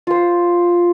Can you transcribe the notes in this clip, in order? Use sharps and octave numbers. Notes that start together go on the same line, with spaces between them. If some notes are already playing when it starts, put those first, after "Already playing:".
F4 C5